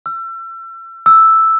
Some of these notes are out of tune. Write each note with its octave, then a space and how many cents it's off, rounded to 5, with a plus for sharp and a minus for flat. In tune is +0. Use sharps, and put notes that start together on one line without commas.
E6 +35
E6 +0